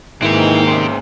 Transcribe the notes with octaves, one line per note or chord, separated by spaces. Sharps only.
G#2 D#3 E3 A#3 C4 E4 G4
C#3 C5